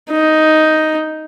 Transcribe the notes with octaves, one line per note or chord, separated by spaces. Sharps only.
D#4